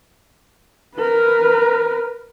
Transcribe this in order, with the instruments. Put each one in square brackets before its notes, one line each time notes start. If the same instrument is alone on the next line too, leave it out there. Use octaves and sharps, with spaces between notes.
[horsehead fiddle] A#4 B4